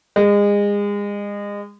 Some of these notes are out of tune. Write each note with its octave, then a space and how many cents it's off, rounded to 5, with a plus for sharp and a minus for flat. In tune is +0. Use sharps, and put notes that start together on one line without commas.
G#3 -30